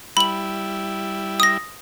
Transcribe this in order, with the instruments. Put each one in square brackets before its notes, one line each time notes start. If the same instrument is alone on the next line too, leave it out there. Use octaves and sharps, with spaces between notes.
[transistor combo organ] G3 E4 [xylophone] B5 F#7
[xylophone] D#6 A#6